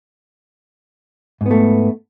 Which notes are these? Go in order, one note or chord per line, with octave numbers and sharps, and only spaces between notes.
G#2 A3 B3